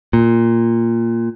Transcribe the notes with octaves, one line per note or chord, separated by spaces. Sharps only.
A#2